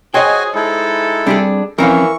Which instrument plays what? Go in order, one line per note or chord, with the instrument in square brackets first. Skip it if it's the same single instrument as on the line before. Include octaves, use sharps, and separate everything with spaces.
[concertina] F#4 G#5 [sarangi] G#4 [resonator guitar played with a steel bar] C5 D#5 [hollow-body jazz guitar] C#5 G5
[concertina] G#3 D#4 E4 [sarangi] A4
[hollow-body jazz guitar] G3 C4 G4 [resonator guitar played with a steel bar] D4 G#4
[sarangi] E3 [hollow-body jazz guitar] F3 C4 C#4 [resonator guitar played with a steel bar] A#4 F5 [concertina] C#6